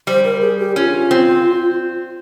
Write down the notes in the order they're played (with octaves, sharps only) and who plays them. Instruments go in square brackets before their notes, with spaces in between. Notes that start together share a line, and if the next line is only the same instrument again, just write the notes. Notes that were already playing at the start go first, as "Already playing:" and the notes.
[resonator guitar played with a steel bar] G3 [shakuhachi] C5
[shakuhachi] A#4
G#4
G4
[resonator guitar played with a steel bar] C#4 [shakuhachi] F4
[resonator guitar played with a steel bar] C4